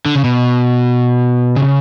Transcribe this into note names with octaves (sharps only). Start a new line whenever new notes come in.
D3
C#3
B2
C#3